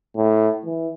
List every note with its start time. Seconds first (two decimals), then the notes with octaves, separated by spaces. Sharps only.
0.16 A2
0.65 E3